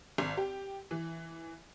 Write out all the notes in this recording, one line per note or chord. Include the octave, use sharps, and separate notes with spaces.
G#1
G4
E3